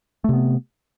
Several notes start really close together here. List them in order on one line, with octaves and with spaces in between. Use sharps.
A3 C3 B3